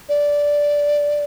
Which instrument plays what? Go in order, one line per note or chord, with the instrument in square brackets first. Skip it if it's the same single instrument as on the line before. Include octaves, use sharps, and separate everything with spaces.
[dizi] D5